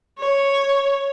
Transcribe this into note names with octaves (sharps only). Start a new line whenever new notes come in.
C#5